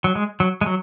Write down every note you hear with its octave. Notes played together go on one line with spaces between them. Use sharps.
F#3
G#3
F#3
G#3
F#3